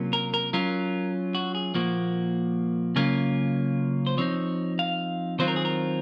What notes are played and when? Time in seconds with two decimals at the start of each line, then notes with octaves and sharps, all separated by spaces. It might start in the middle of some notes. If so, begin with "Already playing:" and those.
Already playing: C3 F#3 A#3 C#4 F4
0.13 A#4
0.34 A#4
0.53 F#3 C#4 F4 A#4
1.35 F#4
1.55 G#4
1.75 A#2 F3 A#3 F#4
2.96 C#3 F#3 A#3 C#4 F4
4.07 C5
4.18 F3 C4 D#4 C#5
4.79 F5
5.39 D#3 F#3 C4 F4 C5
5.48 A#4
5.56 G#4
5.65 A#4